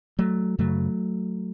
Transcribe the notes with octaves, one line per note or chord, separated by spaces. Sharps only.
F#3 A3
F#2 C#3 F#3 A3